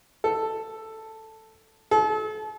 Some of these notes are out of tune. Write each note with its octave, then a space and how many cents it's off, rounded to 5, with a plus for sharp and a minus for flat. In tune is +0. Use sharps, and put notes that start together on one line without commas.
A4 +5
A4 -40